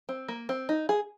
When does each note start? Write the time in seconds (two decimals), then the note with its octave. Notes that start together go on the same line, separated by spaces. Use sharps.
0.09 C4
0.28 A#3
0.49 C4
0.69 D#4
0.89 G#4